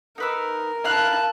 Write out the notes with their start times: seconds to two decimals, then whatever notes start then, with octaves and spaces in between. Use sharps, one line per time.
0.18 D#4 A#4 B4 E6
0.85 E4 F5 A5 F#6